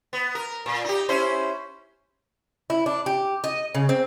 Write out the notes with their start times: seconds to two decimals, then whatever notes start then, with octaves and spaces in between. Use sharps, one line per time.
0.13 B3
0.35 A#4
0.66 A#2
0.84 D#4 G4
1.09 C#4 E4 C5
2.70 E4
2.86 D4
3.06 G4
3.44 D#5
3.75 C#3
3.89 C4